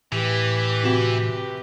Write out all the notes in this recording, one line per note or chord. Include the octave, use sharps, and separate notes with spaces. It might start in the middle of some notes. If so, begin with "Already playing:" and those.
A2 E3 G4 B4
C3 F#4 E7